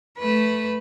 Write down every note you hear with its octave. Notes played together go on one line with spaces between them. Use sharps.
A3 B4